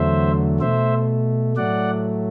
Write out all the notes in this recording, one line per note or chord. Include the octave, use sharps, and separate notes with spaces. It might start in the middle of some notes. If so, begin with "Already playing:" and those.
Already playing: E2 D3 F#3 A3 C5 E5
B2 A3 C5 E5
A2 F#3 A3 D5 F#5